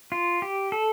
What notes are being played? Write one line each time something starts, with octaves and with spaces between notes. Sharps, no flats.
F4
G4
A4